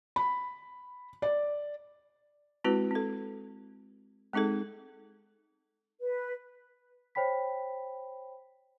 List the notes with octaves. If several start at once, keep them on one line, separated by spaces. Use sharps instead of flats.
B5
D5
G#3 C4 E4 F#4 B4
C4 A4
G#3 C4 D#4 G#4 A4
B4
C5 C#5 G5 B5 B6